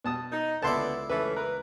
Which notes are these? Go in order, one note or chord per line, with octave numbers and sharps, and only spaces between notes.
B2 A5 D#6
D#4
C#2 D3 B3 E4 D5 A5 C6
E3 A3 C#4 B4
A#4 B4